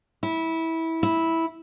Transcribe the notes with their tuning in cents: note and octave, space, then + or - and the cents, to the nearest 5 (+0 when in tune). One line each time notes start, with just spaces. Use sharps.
E4 -20
E4 -10